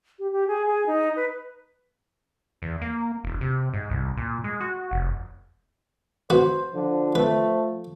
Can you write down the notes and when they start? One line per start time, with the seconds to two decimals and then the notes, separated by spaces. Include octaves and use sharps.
0.19 G4
0.32 G4
0.47 G#4
0.66 G#4
0.86 D#4
1.16 B4
2.62 E2
2.81 A#3
3.24 E1
3.41 C3
3.73 G#2
3.90 C2
4.17 A#2
4.44 G#3
4.60 F#4
4.91 F1
6.30 F#4 B4 C5
6.74 D3 F3
7.15 A3 B4